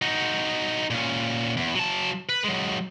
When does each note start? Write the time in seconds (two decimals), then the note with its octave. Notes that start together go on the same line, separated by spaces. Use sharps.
0.02 D#4 F#4
0.91 A#2 C#4
1.57 E2
1.75 F#3 A5
2.29 B4
2.44 F#3 G#3